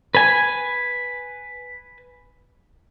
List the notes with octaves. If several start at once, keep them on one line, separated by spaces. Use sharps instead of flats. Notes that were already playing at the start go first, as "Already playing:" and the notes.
B4 G#5